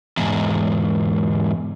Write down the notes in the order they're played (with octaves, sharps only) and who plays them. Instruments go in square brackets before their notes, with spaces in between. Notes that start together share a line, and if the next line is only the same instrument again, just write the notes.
[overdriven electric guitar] E2 G#2